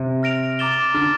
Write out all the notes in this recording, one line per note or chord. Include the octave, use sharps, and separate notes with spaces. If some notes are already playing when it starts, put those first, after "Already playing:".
Already playing: C3
F6 A#6 D7 F7
A#5 D6 A6 E7 G7
D3 C6 F6 A6